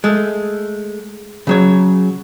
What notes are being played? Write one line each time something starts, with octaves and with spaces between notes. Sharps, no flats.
G#3 A3
C#3 F#3 C#5